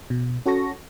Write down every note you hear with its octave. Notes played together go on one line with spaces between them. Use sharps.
B2
C#4 F#4 A4 C#6 A#6